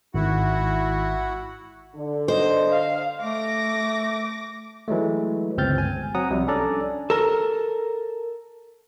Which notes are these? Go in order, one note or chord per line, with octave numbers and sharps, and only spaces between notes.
G#1 E4 F#4 F#5
D3
C5 D#5
F5
A3 D6 A#6
E3 F#3 G#3 A3
G1 C#2 C4 F6 G6 A6
G#5
F#3 C4 F#5 A#5 D#6
C2 C3 F3 G3
C#4 D4 A4 D5 A#5
A4 A#4